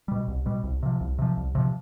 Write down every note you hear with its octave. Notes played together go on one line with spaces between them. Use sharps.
B2 G3
C2
B2 G3
C2
C3 F3
C2
C3 F3
C2
C3 F3